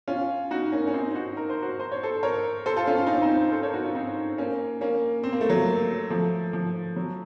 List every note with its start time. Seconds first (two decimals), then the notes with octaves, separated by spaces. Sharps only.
0.08 C#4 F4
0.51 D#4 F#4
0.72 A#3 C#4
0.87 C#4
0.94 C4 D#4
1.15 D#4 F#4
1.37 A#4
1.50 C5
1.62 F#4 A#4
1.80 C5
1.92 C#5
2.03 A4 C5
2.23 A#4 C#5
2.66 A4 C5
2.77 F4 A4
2.87 C#4 F4
2.98 F4
3.06 D#4
3.14 C#4
3.22 C4 D#4
3.52 A4 C5
3.63 A#4 C#5
3.74 D#4 F#4
3.84 C#4 F4
3.95 C4 D#4
4.38 A#3 C#4
4.81 A#3 C#4
5.24 C4
5.33 A#3
5.41 A3
5.49 F#3 A#3
6.10 F3 A3
6.53 F3
6.96 F#3